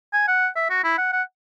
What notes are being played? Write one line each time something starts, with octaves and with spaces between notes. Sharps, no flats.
G#5
F#5
E5
F#4
E4
F#5
F#5